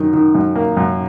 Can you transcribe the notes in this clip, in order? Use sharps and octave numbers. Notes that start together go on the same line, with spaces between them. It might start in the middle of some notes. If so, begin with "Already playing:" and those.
Already playing: F#2 D#3
D#3
F#2
A#3
F#2